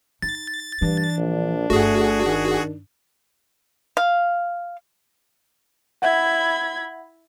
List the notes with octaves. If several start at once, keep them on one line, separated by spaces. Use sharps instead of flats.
D#4 A6
G2 E3 D4
A#1
G1 A3 F#4 G#4
D#3
F5
E4 E5 F#5 B5 G#6